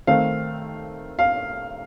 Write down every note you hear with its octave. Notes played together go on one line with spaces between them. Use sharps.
D#3 A3 C4 F5
F5